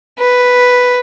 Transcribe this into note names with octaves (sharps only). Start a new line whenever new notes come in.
B4